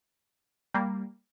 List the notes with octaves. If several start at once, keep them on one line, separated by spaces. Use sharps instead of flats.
G3 A#3